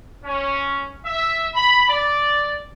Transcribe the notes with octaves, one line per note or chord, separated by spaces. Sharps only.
C#4
E5
B5
D5